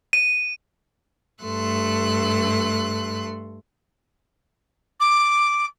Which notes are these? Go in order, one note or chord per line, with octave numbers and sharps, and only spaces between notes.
D#7
G2 A3 A4 C6 F#6
D6